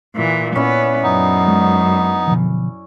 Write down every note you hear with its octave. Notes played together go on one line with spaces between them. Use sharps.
A#2 E3
A#2 B3 C#4 E4 D5
F#2 B3 D#4
G#3
B2 D3 F3